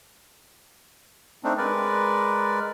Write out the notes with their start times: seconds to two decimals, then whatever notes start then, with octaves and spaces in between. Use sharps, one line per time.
1.44 A3 C4 D4 D#4
1.58 G#3 A#4 B4 D5